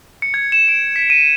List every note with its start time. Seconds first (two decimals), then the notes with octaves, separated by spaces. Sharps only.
0.22 C#7
0.34 G#6
0.52 E7
0.68 D7
0.96 B6
1.10 D#7